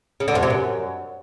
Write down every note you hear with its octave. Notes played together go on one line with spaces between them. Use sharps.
C#3
D3
F2
C3
F#2